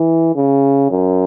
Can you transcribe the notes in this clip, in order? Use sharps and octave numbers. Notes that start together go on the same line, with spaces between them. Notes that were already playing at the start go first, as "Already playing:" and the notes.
Already playing: E3
C#3
F#2